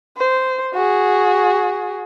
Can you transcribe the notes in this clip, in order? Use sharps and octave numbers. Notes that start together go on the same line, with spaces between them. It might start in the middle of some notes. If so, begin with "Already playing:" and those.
C5
F#4 G#4